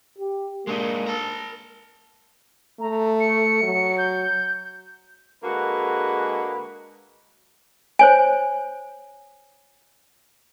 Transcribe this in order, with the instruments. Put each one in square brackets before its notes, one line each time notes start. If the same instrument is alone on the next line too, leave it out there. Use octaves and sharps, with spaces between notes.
[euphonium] G4
[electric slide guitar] G#3 D4 D#4 [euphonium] A#3
[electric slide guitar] A#4 A5
[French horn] A3 [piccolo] A#5
[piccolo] C#7
[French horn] F#3
[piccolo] G6
[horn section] D3 G#3 A#3 F#4 G#4 B4
[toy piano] C5 C#5 G#5